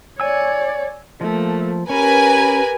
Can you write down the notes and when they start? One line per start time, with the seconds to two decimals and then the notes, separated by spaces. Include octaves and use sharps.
0.20 C#5 D5 G#5 E6
1.21 F3 A3 A#3
1.90 C#4 G4 A#4 B4 G#5